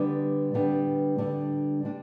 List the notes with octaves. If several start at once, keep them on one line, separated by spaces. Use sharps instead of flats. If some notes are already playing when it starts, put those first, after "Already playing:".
Already playing: D3 G3 B3 D4
D3 G3 B3 D4
D3 G3 B3 D4
D3 G3 B3 D4